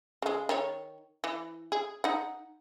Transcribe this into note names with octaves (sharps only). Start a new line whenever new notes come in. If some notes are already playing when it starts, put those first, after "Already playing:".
C#3 G#3
D#3 C#5
E3
G#4
D#4 F#5